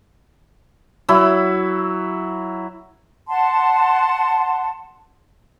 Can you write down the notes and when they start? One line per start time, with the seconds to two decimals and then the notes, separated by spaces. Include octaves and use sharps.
1.09 F#3 E4 B5
3.27 F#5 A5 C6